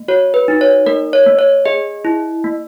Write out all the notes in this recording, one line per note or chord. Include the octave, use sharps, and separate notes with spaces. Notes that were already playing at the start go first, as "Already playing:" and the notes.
Already playing: A#3
F#4 C#5
B4
D#4
C#5
A#3 A#4
C#5
A#3
C#5
G#4 D#5
E4
A#3